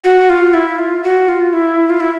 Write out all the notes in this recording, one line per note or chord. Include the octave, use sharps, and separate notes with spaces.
F#4
F4
E4
F4
F#4
F4
E4
F4
E4